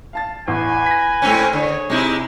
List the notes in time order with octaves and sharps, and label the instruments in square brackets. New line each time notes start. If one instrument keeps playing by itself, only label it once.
[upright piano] F5 A5 A6
[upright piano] A1 E2 [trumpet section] B4 G#5
[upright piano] A#6 B6
[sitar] G#2 C4 C#4 [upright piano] A3 B5
[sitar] D3 [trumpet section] G#4 C#5
[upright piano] C3 [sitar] G#3 D#4 E4